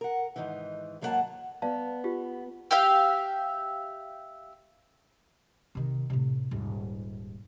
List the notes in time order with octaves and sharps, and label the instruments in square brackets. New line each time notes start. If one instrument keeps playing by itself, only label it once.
[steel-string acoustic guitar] A#4 F#5
G#2 D#3 E3
G#2 F#3 A#3 F4 F#5 A5
[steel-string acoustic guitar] B3 [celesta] D5 F5 A5
[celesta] F4 G4
[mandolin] G4 E5 F5
[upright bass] C3 D#3
A2 C3
D#1 G#2